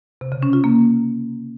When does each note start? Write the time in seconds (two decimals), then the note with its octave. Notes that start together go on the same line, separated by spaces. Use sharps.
0.21 C3
0.32 C#3
0.43 C#4
0.53 F4
0.64 A#3